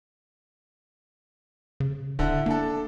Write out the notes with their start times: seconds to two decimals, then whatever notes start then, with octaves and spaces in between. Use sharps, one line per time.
1.80 C#3
2.19 D1 D3 E4
2.46 A#3 D4 A4